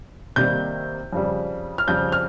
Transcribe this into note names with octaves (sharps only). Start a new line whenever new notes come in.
C3 D#3 G3 A#3 D#4 G6
F2 C#3 G3
F6
F2 C#3 G3 G6
F6